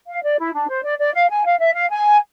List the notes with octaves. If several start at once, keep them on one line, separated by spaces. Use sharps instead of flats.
F5
D5
E4
D4
C5
D5
D5
F5
G#5
F5
E5
F5
G#5